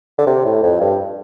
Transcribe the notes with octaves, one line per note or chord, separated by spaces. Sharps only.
D3
C3
A2
F2
G2